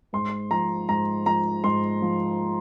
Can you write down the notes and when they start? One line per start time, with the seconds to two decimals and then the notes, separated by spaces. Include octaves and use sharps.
0.13 G#2 C6
0.51 F3 A#5
0.89 G#2 A#5
1.26 F3 A#5
1.64 G#2 C6
2.02 F3